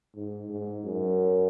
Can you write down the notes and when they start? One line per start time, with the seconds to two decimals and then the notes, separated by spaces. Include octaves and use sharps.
0.15 G#2
0.49 G#2
0.84 F#2